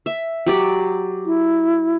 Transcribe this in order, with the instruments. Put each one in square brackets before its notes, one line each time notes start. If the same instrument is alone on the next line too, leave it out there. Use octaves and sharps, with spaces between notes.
[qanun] E5
F#3 G4 D5
[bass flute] E4